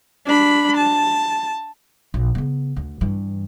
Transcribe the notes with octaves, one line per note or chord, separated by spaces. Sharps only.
D4 B5
A5
A#1
C#3 B3
D2
G2 E3